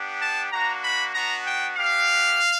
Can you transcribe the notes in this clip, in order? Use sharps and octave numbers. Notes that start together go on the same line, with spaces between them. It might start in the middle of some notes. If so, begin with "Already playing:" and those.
Already playing: B3 D4 G4
A5
A#3 D4 F#4 A#5
B5
B3 D4 F#4 A#5
G5
B3 D4 G4 F5